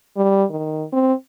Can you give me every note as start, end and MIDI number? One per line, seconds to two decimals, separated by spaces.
0.17 0.44 55
0.50 0.84 51
0.93 1.13 60